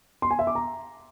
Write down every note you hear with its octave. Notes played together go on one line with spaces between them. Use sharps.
C6
G#5
E5
D6
A#5